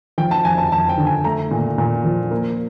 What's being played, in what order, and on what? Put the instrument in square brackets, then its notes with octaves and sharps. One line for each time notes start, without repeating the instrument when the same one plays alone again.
[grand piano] F3 G5
A5
F2 G#5
A5
F2 A5
G5
D3
G#5
A3 A#5
A#2
A#2
F3
A#3